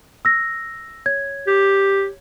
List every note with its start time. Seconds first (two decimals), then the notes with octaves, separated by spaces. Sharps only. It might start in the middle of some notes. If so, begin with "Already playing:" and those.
0.25 E6 A#6
1.06 C#5 G#6
1.47 G4